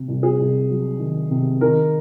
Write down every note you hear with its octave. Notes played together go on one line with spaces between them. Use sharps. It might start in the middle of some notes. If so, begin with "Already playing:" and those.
Already playing: C3
C2
G#4
C2
F#3
D#3
C3
D#3 A#4